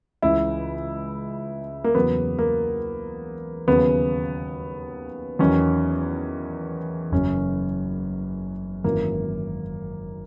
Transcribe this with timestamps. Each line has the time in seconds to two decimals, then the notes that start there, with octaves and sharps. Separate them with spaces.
0.22 C#2 C#3 E3 E4
1.84 A#3
1.95 E2 C#3 F#3 B3
2.39 A#3
3.68 D#2 C#3 F#3 B3
5.39 E2 D#3 F#3 C#4
7.11 F#1 F#2 C#3 C#4
8.84 G#1 F#2 E3 A#3